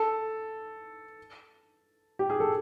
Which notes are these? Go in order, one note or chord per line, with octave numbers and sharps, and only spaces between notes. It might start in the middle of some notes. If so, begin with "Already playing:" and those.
Already playing: A4
G4
G#4
A4